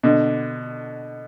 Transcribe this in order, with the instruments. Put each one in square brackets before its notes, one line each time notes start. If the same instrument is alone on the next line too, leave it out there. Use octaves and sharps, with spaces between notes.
[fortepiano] B2 D3